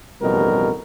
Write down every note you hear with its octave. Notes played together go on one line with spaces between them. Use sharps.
A1 F2 B2 G3 D#4 A#4